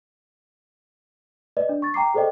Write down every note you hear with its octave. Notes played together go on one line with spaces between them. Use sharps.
B4 D5 D#5
D4
C#6 A6
G5 A#5 D6 C7
G#4 A4 C5 D5 D#5 G5